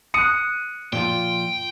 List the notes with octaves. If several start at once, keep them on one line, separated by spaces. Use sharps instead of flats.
D#6 F#6 C#7 D#7
A#2 F3 F4 G5